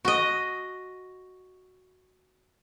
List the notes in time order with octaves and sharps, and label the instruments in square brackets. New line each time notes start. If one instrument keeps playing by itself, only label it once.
[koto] F#4 D#5